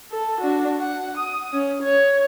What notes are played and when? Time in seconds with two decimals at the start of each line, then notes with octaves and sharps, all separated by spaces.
0.11 A4
0.41 D4 F#4
0.80 F#5
1.18 D#6
1.53 C#4
1.83 C#5